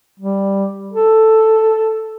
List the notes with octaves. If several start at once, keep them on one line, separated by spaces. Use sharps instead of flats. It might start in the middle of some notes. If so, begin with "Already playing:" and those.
G3
A4